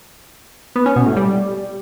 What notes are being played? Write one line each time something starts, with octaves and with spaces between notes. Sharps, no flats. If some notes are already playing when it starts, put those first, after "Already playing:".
B3
C#4
B2
A2
G3